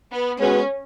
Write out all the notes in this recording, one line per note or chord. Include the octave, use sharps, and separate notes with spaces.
B3
G#3 B3 C#4 F#4 B4